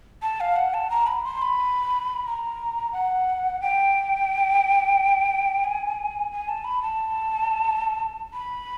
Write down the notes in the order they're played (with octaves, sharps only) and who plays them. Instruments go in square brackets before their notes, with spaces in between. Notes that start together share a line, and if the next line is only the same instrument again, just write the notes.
[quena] A5
F5
F#5
A5
A#5
B5
C6
B5
A#5
F#5
G5
G#5
G#5
A5
B5
A5
B5